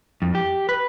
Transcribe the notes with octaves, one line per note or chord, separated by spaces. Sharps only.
F2
G4
B4